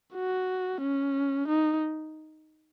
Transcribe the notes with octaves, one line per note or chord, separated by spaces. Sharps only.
F#4
C#4
D#4